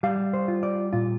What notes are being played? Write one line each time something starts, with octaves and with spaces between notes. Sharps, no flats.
G3 F5
C5
F4
D5
A#2 F4